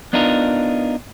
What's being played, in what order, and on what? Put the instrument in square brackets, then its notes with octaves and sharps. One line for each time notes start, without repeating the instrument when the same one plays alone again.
[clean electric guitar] B3 D4 D#4 F4 A#4